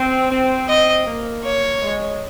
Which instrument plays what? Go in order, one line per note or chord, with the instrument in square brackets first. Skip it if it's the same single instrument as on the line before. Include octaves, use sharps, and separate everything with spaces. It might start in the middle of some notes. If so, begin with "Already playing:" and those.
Already playing: [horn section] C4
C4
[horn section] C4 [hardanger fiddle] D#5
[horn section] A#3
[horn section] A#3 [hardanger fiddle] C#5
[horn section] G#3